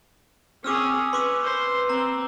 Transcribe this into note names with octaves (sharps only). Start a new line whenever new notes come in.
C4 C#4 G#4 D6 E6 F6
C#4 B4 C6 D6 E6
C5
C4 A#5